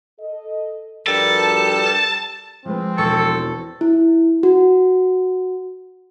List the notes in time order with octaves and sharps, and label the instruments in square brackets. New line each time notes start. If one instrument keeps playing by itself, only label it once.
[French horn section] A4 D#5
[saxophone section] G2 G3 A4 [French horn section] F3 F#4 A#4 [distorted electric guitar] A5
[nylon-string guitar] F3 G#3 B4 [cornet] C4
[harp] E1 C#6 [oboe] A4
[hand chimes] E4
F#4